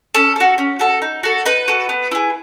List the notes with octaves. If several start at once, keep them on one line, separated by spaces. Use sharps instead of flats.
C#4 A4
F#4 A4
C#4
F#4 A4
D#4
F#4 A4
D#4 B4
F#4 A4
B3
E4 G#4